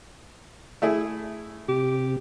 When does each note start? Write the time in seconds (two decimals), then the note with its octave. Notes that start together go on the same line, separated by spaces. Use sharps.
0.82 A3 E4 G#4
1.69 C3 G4